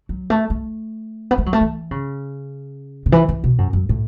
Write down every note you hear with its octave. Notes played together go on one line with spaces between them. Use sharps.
F#3
A3
A3
B3
A3
F#3
A3
E3
C#3
C#3
E3
E3
B2
F#2
F#2
A2